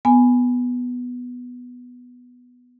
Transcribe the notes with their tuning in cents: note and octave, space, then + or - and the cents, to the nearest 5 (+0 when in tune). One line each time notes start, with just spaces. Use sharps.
B3 +0 G#5 +0